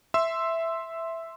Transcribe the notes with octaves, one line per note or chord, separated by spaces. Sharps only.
E5 C6 E6